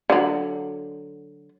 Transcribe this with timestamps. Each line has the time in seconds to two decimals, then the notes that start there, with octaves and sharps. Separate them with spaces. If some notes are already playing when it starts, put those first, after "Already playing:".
0.10 D3 F#3